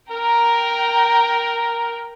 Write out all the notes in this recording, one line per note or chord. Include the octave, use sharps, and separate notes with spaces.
A#4 G5 A#5